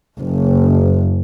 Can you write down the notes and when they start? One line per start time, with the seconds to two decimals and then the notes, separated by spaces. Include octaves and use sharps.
0.17 F#1